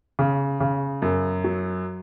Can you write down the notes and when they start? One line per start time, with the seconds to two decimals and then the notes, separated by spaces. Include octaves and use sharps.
0.19 C#3
0.60 C#3
1.02 F#2
1.44 F#3